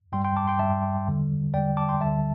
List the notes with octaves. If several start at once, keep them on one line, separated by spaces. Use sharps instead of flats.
G2 G3 G5 C6
G5 C6
A5 D6
G5 C6
G2 G3 E5 A5
E2 D3 G3
E2 D3 G3 D5 G5
A5 D6
G5 C6
D2 D3 G3 E5 A5